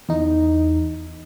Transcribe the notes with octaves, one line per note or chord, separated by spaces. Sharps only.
E2 D#4